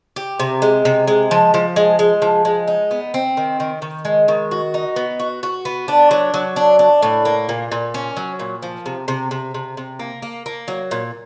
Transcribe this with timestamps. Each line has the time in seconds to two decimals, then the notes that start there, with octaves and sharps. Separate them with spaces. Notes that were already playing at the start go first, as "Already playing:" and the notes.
0.16 G4
0.39 C3
0.62 G#3
0.85 C3
1.07 G#3
1.31 F3
1.54 F3
1.76 G#3
1.99 G#3
2.22 F3
2.45 G#3
2.68 D#4
2.91 B3
3.14 C4
3.37 D#3
3.60 D#3
3.82 D#3
4.05 G#3
4.28 D#3
4.51 F#4
4.74 D#4
4.96 B3
5.19 F#4
5.43 F#4
5.65 B3
5.88 D4
6.11 F#3
6.34 F#3
6.56 D4
6.79 D4
7.03 A2
7.25 A#3
7.49 A#2
7.72 A#2
7.94 C#4
8.17 F#3
8.39 A#2
8.63 F3
8.86 C3
9.08 C3
9.31 C3
9.54 C3
9.77 C3
9.99 A#3
10.22 A#3
10.46 A#3
10.68 F#3
10.91 A#2